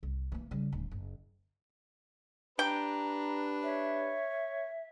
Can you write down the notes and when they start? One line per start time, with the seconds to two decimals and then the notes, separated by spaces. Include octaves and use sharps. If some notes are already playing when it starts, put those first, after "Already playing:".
0.03 C2
0.32 E3 A#3
0.51 C#3 G3
0.73 D1
0.91 F#1
2.59 D4 G4 B4 G5 A#5
3.63 C#5 E5